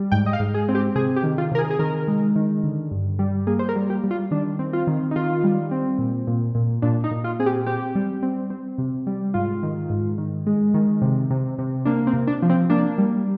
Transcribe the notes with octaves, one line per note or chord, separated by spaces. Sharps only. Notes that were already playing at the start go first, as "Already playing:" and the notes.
Already playing: G3
G#2 G5
D#5
F5
G#2
G#4
C4
G4
C3 G#4
G4
D#3
F4
C3 A#4
G#4
G#4
D#3 A#4
G#3
D#3
D3
G2
G3
A#3 G#4
C5
A#4
G3
G4
G3
F4
D#3 D4
C4
F4
D#3
D#4
D#3 F4
G3
C4
A#2
A#2
A#2
A#2 D4
D#4
A#2
F4
C4 G#4
G4
C4 G4
G3
C4
C4
C3
G3
G#2 F4
D#3
G#2
D#3
G#3
D#3
C3
C3
C3
A#3 D4
C4
C3
D4
F3
C4
A#3 D4
G3